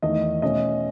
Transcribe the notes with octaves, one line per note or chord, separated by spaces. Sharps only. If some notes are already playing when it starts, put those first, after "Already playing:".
E2 D#3 A3 D#5
B2 A3 C#4 D#5